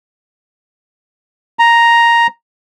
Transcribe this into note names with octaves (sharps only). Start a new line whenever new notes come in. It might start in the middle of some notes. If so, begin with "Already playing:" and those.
A#5